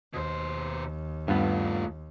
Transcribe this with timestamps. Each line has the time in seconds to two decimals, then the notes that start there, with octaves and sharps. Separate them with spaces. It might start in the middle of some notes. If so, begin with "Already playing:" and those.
0.14 D#2 B2 C5
1.28 G2 A3 B3 F4